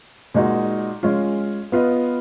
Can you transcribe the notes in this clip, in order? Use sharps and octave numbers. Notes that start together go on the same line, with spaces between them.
A#2 G#3 D#4 F#4
G#3 C#4 F4
B3 F4 B4 D#5